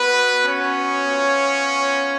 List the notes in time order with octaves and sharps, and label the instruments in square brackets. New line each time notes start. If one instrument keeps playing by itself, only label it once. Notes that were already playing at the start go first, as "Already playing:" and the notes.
Already playing: [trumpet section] B3 F#4 B4
C#4 C#5
B3 F4